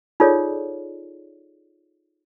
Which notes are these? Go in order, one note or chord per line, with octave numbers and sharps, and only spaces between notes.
D#4 F4 G#4 A4 C#5 D5